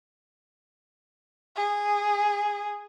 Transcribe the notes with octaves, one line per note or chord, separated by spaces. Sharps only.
G#4